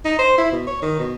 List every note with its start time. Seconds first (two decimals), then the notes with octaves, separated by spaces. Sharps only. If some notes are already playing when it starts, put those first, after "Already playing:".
0.05 D#4
0.19 C5
0.38 E4
0.52 B2
0.67 C#5
0.82 D#3
0.99 B2